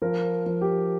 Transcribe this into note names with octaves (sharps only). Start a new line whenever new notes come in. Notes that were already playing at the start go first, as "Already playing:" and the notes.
F3 A#4
F3
G4